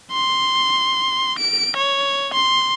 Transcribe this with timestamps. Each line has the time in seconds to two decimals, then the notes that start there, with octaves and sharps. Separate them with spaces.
0.12 C6
1.39 D7
1.77 C#5
2.34 C6